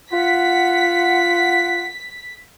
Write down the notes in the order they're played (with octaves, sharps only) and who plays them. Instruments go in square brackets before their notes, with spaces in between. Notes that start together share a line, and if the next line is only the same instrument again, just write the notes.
[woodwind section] F4 F#5 [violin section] B6